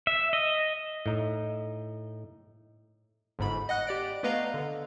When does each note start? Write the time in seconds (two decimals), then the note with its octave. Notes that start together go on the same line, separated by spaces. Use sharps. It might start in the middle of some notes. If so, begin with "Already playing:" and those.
0.07 E5
0.33 D#5
1.06 A2 D#4
3.39 G1 G#2 B5
3.69 D#5 F#5 F#6
3.87 G4 D5 D7
4.23 A3 B3 B4 D#5 F5 A#5
4.54 D3